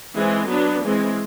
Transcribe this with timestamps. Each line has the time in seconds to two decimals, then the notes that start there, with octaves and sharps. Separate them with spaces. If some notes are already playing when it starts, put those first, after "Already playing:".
0.16 E3 G#3 C4
0.48 F#3 B3 D4
0.82 E3 G#3 C4